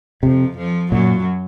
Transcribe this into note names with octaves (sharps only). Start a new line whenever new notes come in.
F2 C3 F3
F2 F3
F#2 A#2 F#3